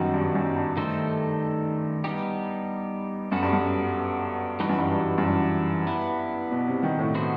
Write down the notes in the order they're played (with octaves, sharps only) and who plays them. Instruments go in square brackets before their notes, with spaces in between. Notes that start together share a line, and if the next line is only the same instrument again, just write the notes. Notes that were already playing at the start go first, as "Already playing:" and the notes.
Already playing: [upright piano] F#2 D#3 F#3 [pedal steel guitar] G3 B3 D#4 F#4
[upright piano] G2
F#2
G2
[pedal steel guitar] D#3 A3 D#4 A4 C5
G3 B3 D#4 G4
[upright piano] F#2 [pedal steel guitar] B3 F#4 A4
[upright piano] G2
F#2
[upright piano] G2 [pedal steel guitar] E3 G3 D#4 F#4 B4
[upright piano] F#2
G2
G2
F#2
G2
[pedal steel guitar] B3 E4 B4
[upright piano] B2
C3
D#3
A2
[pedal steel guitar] B3 F#4 C5